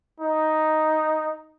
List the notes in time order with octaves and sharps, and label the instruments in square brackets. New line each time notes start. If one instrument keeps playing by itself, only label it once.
[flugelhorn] D#4